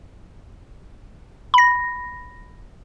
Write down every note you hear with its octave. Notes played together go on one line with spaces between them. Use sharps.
B5 A#6